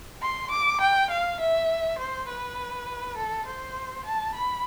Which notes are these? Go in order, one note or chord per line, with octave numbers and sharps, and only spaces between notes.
C6
D6
G5
F5
E5
C5
B4
A4
C5
A5
B5